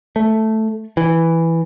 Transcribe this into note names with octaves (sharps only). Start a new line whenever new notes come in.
A3
E3